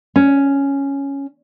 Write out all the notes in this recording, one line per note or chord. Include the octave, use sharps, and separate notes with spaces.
C#4